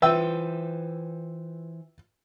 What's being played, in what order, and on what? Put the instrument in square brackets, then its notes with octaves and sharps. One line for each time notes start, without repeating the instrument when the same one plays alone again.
[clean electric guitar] E3 C5 [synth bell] F4 B4 [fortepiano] E5 G5 E6